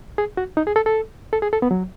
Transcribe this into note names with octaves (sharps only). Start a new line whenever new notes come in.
G#4
F#4
D#4
G#4
A4
A4
A4
G#4
A4
B3
F#3